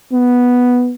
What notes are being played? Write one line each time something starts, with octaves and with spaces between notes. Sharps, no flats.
B3